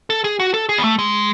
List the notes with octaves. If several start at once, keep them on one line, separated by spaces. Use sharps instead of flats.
A4
G#4
F#4
A4
G#4
B3
A3
G#3